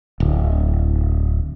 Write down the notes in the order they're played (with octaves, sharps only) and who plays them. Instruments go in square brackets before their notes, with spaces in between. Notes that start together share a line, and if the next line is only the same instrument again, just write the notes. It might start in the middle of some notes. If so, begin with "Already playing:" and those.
[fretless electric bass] D1